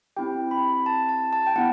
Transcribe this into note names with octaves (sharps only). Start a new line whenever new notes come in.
C4 E4 G4 G5
B5
A5
A5
A5
G5
B3 E4 F#5